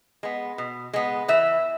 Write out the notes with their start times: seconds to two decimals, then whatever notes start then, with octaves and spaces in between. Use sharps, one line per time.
0.23 G#3 B3
0.58 B2
0.93 G#3 B3
1.28 E3 E5